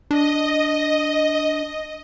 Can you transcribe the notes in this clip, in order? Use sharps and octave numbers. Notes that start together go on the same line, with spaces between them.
D4 D#5